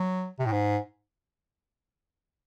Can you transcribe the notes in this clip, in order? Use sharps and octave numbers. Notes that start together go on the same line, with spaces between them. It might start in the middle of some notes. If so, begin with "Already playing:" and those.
Already playing: F#3
C3
A2
G#2